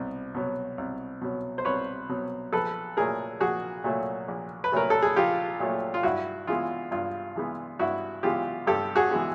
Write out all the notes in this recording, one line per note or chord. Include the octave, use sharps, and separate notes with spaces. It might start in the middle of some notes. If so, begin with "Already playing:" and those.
Already playing: C2 B2
B2 F#3
C2
B2 F#3
C5
C2 B4 C#5
B2 F#3
A#1 A4 B4
A#2 F#3 A3 G#4 A#4
A#1 F#4 G#4
A#2 F#3 A3
A#1
B4
A#2 F#3 A3 A#4
A4
G#4
A#1 F4 G4
A#2 F#3 A3
F4
G2 E4 F#4
E3 G#3 B3 F4
G2 F4
E3 G#3 B3
G2 E4 F#4
E3 G#3 B3 F4 G4
G2 G4 A4
F#4 G#4
E3 G#3 B3